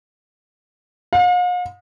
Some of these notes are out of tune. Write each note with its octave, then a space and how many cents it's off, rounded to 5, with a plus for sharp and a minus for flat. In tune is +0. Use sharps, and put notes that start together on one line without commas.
F5 +45